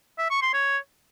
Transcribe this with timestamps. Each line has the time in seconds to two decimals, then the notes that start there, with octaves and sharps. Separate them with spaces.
0.18 E5
0.30 C#6
0.42 C6
0.53 C#5